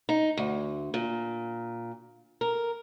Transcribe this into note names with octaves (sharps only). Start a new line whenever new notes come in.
D#4
D2
A#2
A#4